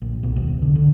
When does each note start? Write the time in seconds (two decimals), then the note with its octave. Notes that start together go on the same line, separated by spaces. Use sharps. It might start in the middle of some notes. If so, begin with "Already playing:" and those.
0.02 A#1
0.23 B1
0.36 D#1
0.49 B1
0.62 D3
0.75 D3